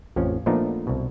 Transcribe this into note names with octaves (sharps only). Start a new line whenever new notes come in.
A1 F2 F3 C#4
A#2 F3 A3 B3 D4 D#4
C2 B2